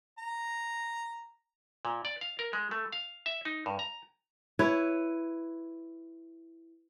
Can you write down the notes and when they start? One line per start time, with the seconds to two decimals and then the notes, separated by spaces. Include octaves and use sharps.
0.18 A#5
1.85 A#2
2.05 D5
2.21 F5
2.39 A#4
2.53 G#3
2.71 A3
2.92 F5
3.26 E5
3.45 D#4
3.66 G2
3.79 A#5
4.59 E4 B4 C#5